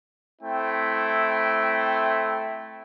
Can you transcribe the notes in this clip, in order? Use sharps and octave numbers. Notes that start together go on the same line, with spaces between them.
A3 C4 E4 G5